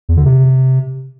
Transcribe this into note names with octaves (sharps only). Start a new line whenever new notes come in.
E2
D3
C3